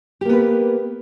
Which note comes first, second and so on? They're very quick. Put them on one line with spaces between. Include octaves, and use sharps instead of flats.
G4 A#3 B3 B4